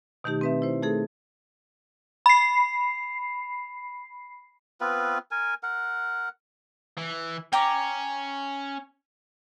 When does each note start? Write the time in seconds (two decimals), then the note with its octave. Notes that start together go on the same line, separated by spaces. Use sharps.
0.24 B2 D#3 A3 D#4 G4
0.41 C4 B4 E5
0.62 E4 C5
0.82 A3 D#4 G#4 A4
2.26 B5 C7
4.81 B3 C4 F4 B4
5.31 A#4 G#5
5.63 A#4 F#5
6.98 E3
7.53 C#4 G5 A#5 D6